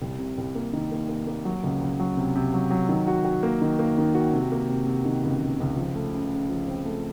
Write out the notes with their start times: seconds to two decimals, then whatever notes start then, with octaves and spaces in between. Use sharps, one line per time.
0.02 C2
0.19 C3
0.38 C2
0.55 A#3
0.73 D#3
0.92 A#3
1.09 A#3
1.27 A#3
1.45 F#3
1.64 C#2
1.81 C#2
1.99 F#3
2.17 C3
2.36 C3
2.54 F#3
2.71 F#3
2.89 D#3
3.08 F#4
3.25 F#4
3.43 A#3
3.62 D#3
3.79 A#3
3.98 D#3
4.15 F#4
4.33 C3
4.52 A#3
4.69 C3
4.87 C3
5.05 D#3
5.23 C#2
5.41 C#2
5.60 C#2
5.77 F3
5.95 A3
6.13 C#3
6.32 C#3
6.49 F3
6.68 C4
6.85 A3